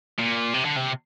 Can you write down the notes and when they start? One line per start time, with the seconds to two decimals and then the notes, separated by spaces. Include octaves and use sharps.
0.19 A#2
0.54 C3
0.65 D3
0.76 C3